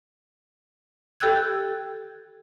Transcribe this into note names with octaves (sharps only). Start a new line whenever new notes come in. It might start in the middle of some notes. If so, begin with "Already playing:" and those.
G4 A4 G5 E6 F#6 G#6